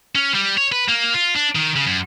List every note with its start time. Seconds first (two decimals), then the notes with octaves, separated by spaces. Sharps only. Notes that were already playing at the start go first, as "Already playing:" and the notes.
0.15 C#4
0.35 G3
0.57 C#5
0.72 B4
0.88 A#3
1.14 F4
1.36 D4
1.55 D#3
1.76 C#3
1.87 F#2